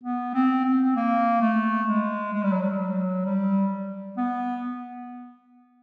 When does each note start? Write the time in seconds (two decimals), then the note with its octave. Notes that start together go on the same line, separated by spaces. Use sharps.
0.04 B3
0.34 C4
0.65 C4
0.96 A#3
1.41 A3
1.88 G#3
2.33 G#3
2.43 G3
2.52 F#3
2.62 G3
2.80 F#3
3.26 G3
4.17 B3